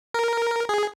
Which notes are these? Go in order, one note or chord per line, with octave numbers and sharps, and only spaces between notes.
A#4
G#4